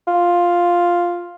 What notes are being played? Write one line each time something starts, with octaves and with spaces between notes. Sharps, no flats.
F4